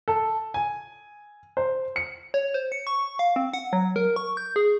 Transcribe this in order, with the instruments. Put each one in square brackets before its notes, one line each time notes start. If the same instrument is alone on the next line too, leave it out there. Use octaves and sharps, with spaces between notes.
[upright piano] A4
G#5
C5
C#7
[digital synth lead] C#5
C5
C#7
C#6
F5
C4
F#5
F#3
A#4
C#6
G6
G#4